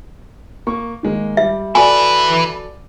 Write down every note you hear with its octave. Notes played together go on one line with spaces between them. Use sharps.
A#3 C#6
D#3 G#3 A#3
G3 E5
E4 F#4 A4 B4 D5 G#5